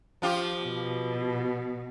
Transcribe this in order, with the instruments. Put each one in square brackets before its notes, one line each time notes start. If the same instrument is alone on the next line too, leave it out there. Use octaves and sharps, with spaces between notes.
[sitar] F3 F4 G4
[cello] B2